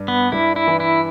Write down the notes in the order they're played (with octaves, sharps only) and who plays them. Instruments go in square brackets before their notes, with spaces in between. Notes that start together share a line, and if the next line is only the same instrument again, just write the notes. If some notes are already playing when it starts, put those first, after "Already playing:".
Already playing: [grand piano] G2 G3
[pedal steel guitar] B3
[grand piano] G2 G3 [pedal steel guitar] E4
[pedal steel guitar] E4
[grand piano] E3
[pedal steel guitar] E4